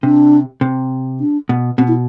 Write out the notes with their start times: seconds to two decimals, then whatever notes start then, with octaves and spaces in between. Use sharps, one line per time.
0.03 C3 D4
0.61 C3
1.20 D4
1.49 B2
1.78 B2 C4
1.88 E4